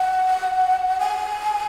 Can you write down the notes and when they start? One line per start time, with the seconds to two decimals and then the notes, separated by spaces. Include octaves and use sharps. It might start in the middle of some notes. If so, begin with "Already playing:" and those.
Already playing: F#5
1.00 G#5